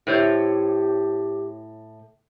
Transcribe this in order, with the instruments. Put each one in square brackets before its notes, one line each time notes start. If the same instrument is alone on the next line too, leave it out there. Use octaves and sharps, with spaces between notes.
[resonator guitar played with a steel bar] A2 C5 C#5 [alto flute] G4